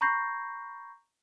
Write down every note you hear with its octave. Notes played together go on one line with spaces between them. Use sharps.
A#5 B5 C#6 G6 A#6 C7